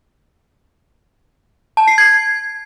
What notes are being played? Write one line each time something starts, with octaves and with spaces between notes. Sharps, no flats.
A5
C7
G#6